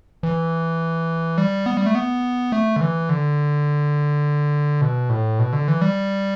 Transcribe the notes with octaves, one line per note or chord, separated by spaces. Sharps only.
E3
G3
B3
G3
A3
B3
A3
D3
E3
D3
B2
A2
B2
D3
E3
G3